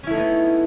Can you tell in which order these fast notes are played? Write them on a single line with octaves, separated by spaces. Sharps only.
C#4 E4 A3 D#4 B3